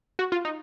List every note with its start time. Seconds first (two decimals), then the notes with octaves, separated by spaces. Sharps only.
0.19 F#4
0.32 F4
0.45 D#4